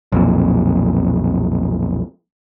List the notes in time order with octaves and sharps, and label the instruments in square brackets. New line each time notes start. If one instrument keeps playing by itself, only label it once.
[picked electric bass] B1 F2 A#2